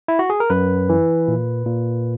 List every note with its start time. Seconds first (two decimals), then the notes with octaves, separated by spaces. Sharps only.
0.08 E4
0.19 F#4
0.30 G#4
0.40 A#4
0.50 F#2 B4
0.89 E3
1.28 A#2
1.66 A#2